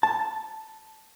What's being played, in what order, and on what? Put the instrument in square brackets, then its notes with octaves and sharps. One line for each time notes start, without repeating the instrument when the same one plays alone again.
[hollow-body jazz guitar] A5